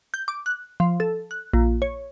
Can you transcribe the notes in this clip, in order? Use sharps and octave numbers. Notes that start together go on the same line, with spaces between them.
G6
D6
F#6
F3
A4
F#6
A#1
C#5